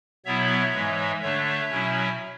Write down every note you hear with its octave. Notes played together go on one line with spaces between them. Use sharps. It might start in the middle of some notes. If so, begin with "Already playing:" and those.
B2 F#3 B3 E4 C#5 E5
G#2 E3 G#3
D3 A3 D4 C#5 E5
B2 F#3 C#4 E4